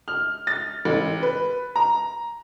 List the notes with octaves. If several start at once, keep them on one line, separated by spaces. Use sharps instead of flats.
F6
A6
A1
B4
A#5